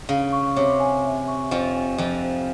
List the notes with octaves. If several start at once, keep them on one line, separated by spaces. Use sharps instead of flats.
C#3 F5
C#6
C3 C#5
G#5
E5
C#6
F2 F3 C5
G#5
F2 F3 E5
C5